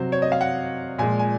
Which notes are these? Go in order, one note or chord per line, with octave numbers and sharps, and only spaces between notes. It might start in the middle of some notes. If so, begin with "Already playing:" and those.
Already playing: C3 F#3 C5
C#5
D#5
F5
F#5
A#2 F3 G#3 G#5
G#5